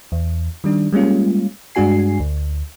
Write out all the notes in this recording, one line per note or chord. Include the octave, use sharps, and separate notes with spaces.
E2
D#3 G3 D4
G3 G#3 A#3 C#4 F4
G2 G#3 D4 F#4 G#5 C7
D2